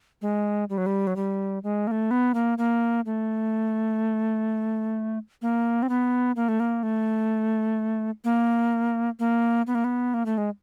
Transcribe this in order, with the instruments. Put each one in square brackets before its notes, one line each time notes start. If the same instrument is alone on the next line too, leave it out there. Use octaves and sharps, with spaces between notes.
[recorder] G#3
G3
F#3
G3
F#3
G3
G#3
A#3
A3
B3
A#3
A#3
A3
A#3
C4
B3
A#3
A3
A#3
A3
A#3
A#3
B3
A#3
B3
A#3
A3
G#3